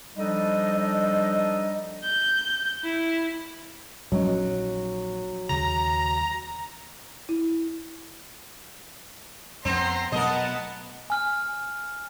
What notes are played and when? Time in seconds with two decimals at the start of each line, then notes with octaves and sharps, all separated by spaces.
0.17 F3 G3 D4 D#4 A4 D#5
2.04 G6
2.84 E4
4.12 A#1 D#3 F#3 C#4 D#4
5.49 D#2 C#3 A#5
7.29 E4
9.65 F2 B3 C4 A#5 C6
10.12 B2 F#3 A3 B3 A#4 D#5 F#5 A5
11.10 G#5 F6